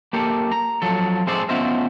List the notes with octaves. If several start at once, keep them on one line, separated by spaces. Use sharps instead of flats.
A#3 G4 A4
A#5
F3 F#3 A4
G#3 C4 G#4 A4 C5 D5
B3 C#4 F4 C5 D#5 E5